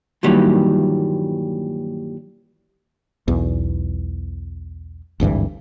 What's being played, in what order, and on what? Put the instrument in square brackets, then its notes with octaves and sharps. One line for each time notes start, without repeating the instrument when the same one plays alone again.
[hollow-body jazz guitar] G2 A#2 D#3 E3 F#3 G3
[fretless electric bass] B1 E2
G#1 D2 G2 E3